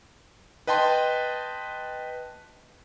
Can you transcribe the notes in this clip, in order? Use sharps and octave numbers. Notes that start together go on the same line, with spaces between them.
B4 D#5 G5 A5 C6